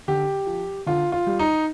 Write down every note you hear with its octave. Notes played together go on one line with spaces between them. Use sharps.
D3 G4
F3
D3 F4
F4
G3
D#4